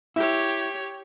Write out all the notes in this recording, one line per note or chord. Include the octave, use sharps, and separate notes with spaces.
E4 G4 C#5